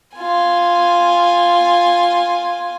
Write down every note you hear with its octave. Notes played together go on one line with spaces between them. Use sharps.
F4 G#5